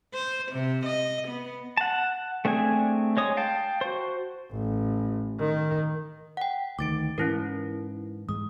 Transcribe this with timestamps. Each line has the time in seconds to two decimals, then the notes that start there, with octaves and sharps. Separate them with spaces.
0.13 C5
0.52 C3
0.85 D#5
1.28 B3
1.77 F#5 A5
2.45 A3 C4 D4 G#4 G#5
3.17 G#3 C#5 D#6
3.37 F5 G5 A5
3.81 F#4 C5
4.51 A1
5.39 D#3
6.37 F#5 G5
6.79 D2 D#3 D6 A6 D7
7.18 G#2 E3 C#4 E4 A#4
8.29 G#2 G#3 D#6